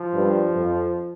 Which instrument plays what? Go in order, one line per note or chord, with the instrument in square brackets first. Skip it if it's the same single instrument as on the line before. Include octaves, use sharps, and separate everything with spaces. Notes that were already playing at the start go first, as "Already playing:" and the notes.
Already playing: [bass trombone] F3
[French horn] G2
F2